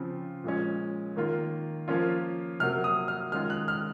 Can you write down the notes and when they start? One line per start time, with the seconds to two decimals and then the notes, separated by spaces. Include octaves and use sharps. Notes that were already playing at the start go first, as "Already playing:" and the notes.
Already playing: C#3 F3 C4 F4
0.44 A#2 F3 G#3 C#4
1.16 D#3 A#3 F4
1.88 F3 A#3 C#4 F4
2.60 C3 F#3 A#3 F6
2.84 D#6
3.08 F6
3.32 D#3 G#3 C#4 F4 F6
3.50 F#6
3.68 F6